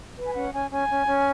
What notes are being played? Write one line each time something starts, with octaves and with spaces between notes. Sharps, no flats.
B4
G#5
C#4 F#5
C#4 G#5
C#4 G#5
C#4
C#4